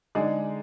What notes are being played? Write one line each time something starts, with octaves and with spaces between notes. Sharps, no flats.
D3 G#3 D#4 G#4 D5